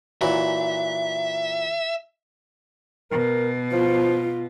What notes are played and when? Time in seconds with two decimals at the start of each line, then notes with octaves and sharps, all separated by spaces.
0.22 A#2 E3 F#3 E5
3.11 B2 A#4
3.73 F3 F4